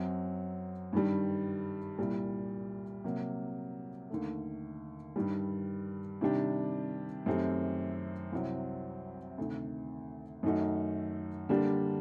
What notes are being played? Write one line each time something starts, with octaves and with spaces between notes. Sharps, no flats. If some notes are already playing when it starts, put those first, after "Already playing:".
Already playing: F#2 F#3 C4
G2 D#3 G3
C2 A#2 G3
C3 F#3 A#3
D#2 D3 A3
G2 D#3 G3
C3 D#3 G3 D4 G4
F#2 D#3 A3 C4 G4
C2 C3 F#3 C4
D2 C3 D#3
F#2 D#3 A3 D#4 F#4
D3 G3 A#3 D4 G4